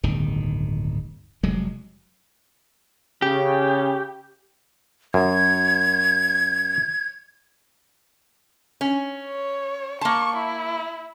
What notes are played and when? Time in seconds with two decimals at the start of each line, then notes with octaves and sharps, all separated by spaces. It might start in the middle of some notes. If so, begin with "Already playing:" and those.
0.03 D1 G1 D#3
1.43 F1 F#3 G#3
3.22 C#3 G4
5.14 F#2 G#6
8.81 C#4
9.20 C#5
10.01 A#3 A5 C#6
10.36 E4